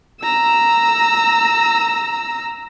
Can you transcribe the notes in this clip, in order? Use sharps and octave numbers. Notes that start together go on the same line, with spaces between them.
A#5 E6